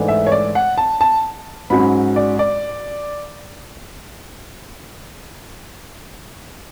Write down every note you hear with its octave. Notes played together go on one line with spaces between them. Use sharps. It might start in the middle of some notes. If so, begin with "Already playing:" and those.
Already playing: G#2 E3 A3 D4
E5
C#5
D5
F#5
A5
A5
G#2 F#3 C#4 B5
D5
D5